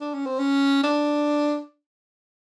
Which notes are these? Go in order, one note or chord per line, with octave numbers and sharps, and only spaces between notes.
D4
C#4
C4
C#4
D4